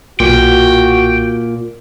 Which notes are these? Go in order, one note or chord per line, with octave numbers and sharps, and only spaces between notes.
B1 A#2 F#4 G5